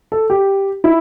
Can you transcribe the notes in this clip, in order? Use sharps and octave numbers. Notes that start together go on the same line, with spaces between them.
A4
G4
E4